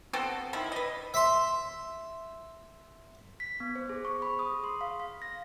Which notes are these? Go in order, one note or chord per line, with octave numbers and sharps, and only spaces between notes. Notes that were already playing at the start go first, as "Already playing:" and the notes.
B3 C4 F#4 A4
D#3 F3 E4
B4 D#5
E5 C6
B6
B3
C5
G#4
C#6
B5
D#6
G#4
C6
F5
F5
A#6